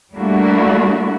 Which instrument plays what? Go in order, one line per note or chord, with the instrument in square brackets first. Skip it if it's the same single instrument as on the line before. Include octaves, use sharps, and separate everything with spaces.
[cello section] G3 A3 A#3 D4 E4 F#4